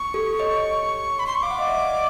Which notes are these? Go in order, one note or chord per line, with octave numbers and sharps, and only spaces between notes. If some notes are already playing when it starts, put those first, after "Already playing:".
Already playing: C#6
G4 A4
C#5 D#5
B5
C6
C#6
F5 D6
F#5
D#5 F5
D5 E5
D5
D#5